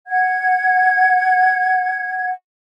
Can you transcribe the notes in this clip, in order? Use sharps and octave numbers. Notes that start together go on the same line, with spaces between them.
F#5 G#6